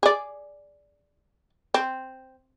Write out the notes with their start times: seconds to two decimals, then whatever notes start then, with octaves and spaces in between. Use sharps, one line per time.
0.03 G#4 D5
1.74 C4